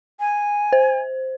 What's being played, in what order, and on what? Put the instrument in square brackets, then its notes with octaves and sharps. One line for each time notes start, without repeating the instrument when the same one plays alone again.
[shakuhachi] G#5
[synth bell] C5